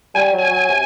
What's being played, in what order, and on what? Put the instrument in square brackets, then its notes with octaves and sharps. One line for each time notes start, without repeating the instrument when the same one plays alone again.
[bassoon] G3 [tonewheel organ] G#5
[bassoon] F#3
[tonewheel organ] G#5
[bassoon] F#3
C3